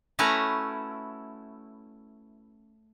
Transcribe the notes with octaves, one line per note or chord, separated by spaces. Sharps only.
A3 C#4 E4 F#4 B4 A#5